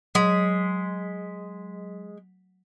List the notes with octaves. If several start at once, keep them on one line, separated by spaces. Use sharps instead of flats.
F#3 G#3 B6